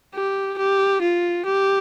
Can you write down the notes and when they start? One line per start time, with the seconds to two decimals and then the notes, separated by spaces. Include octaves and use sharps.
0.14 G4
0.58 G4
1.02 F4
1.45 G4